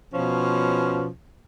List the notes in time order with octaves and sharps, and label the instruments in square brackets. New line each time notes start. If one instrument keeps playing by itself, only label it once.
[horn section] B2 F3 C#4